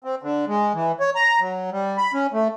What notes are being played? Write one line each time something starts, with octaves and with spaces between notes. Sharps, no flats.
C4
D3
G#3
E3
C#5
A#5
F#3
G3
B5
C#4
A3